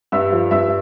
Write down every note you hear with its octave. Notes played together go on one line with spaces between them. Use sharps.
G2 E5 E6
F3
G2 E5 E6